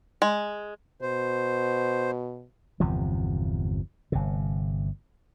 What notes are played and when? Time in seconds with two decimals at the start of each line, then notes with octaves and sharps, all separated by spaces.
0.22 G#3
1.02 B2 C5
2.80 G1 E2 C3 F3
4.12 G1 C3